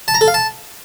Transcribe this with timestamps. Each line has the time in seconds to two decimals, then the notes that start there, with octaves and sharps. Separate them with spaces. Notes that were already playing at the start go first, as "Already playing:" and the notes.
0.08 A5
0.15 A#5
0.21 A4
0.28 F5
0.34 A5